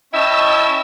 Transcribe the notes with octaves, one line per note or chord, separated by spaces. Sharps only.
C#4 E4 D#5 E5 G5 A5 E6